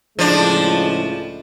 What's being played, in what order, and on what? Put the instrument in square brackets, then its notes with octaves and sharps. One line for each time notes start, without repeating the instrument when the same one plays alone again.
[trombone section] C#2 A2 G#3 [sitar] F3 D4